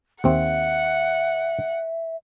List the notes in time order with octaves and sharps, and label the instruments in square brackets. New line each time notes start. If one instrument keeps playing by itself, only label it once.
[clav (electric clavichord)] D#2 C4 [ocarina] E5 [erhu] F#5